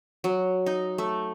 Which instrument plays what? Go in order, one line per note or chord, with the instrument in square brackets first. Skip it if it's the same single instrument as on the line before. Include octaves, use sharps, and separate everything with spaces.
[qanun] F#3
D#4
A3